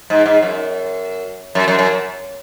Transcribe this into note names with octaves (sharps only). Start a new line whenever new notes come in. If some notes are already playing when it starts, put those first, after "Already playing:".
G#2
G#2
F#2
F#2
F#2
F#2